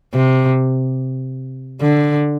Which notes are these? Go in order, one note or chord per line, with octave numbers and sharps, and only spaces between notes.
C3
D3